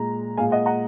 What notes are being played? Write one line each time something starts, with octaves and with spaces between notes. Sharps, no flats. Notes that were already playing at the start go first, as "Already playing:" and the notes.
Already playing: A#2 G#3 A#5
A#2 G#3 F5 G#5
D#5 F#5
F#5 A#5